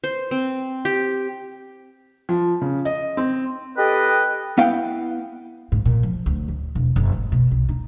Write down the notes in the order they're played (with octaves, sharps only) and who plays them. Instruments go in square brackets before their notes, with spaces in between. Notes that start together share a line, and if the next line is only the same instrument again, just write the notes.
[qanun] C5
C4
G4
[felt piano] F3
C#3
D#5
C4
[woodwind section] G4 A4 B4 D#5 G5
[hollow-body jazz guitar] B3 E4 F5 G5
[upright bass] G#2
A#2
F3
D2
D#2
E1
F#1
G#2
B2
C2
D#4